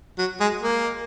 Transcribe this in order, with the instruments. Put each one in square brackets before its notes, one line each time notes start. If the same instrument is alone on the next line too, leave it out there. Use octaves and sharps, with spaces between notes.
[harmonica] F#3
G#3
A#3